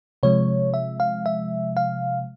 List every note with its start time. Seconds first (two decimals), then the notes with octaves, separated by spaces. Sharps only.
0.23 C3 F3 G#3 C#5
0.74 E5
1.00 F5
1.26 E5
1.77 F5